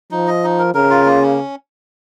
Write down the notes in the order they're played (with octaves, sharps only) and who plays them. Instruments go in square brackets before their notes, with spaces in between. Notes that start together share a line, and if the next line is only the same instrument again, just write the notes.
[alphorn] F3 [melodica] D#4
[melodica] D#5
D#4
A#4
[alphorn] C#3 [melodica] A#4
[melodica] F4
A#3
C#4